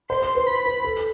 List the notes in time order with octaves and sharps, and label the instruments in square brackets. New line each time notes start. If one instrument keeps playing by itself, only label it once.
[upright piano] C5 [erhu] C6
[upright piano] C5
B4
[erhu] B5
[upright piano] B4
A4